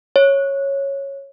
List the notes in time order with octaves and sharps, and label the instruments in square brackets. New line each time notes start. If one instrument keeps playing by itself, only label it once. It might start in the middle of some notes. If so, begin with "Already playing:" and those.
[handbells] C#5